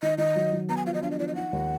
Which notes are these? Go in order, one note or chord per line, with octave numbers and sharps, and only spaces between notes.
D#3 D#5
D#3 D#5
F#3
F#3
B3 A#5
G#5
F3 F5
D#5
D4 F5
D#5
F3 D5
D#5
D#4 F#5
D#2